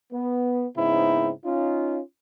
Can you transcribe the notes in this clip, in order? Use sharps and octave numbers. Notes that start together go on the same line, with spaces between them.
B3
G#2 C#3 B3 C4 D#4 E4
C#4 D#4 F4